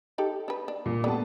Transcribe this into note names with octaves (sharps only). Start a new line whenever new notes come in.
D#4 G4 A4
D4 B4
D4
A#2
D3 G3 A3 B3 A5